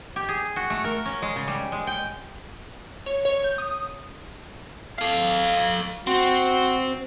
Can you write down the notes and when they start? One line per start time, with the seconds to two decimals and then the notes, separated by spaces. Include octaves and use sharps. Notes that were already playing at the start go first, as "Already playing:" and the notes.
0.16 G4
0.29 G#4
0.56 F#4
0.70 A3
0.84 A#4
1.05 C#4
1.22 G#3
1.36 C#3
1.48 G3
1.72 G#3
1.87 G5
3.06 C#5
3.25 C#5
3.44 G6
3.58 D#6
3.71 D#6
4.99 A4 F5
6.07 C4 F#4